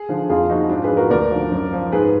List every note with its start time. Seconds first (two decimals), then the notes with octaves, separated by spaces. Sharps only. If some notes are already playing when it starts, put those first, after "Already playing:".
Already playing: G#4
0.09 D3 F3
0.29 F2 F4 G#4
0.50 F3 D#4 F#4
0.70 G#2 D4 F4
0.84 G#4 B4
0.91 F3
0.97 F#4 A#4
1.10 D2 A#4 D5
1.31 D3 F3
1.52 F#2
1.73 F3
1.92 G#2 G#4 B4